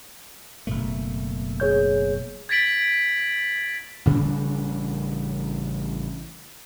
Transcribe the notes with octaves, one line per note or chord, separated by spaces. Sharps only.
F#1 B2 A3
G#4 C#5 G6
G#6 A6 B6 D7 F#7
A1 C#3 G3 D4